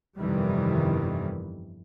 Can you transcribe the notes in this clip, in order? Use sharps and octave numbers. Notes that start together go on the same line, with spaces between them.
G1 F2 C3 D#3 E3 G3